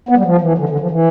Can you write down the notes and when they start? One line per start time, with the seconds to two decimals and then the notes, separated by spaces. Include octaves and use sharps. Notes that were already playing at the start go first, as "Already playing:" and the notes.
0.09 B3
0.17 G3
0.25 F3
0.41 E3
0.58 D3
0.69 D3
0.80 F3
0.91 E3